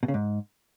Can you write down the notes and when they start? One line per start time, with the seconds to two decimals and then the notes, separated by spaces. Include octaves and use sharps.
0.03 B2
0.08 C#3
0.14 G#2